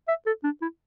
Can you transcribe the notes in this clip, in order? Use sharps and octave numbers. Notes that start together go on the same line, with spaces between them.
E5
A4
D4
E4